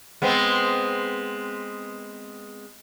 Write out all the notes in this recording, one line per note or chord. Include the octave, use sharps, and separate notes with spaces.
G#3 B3 C4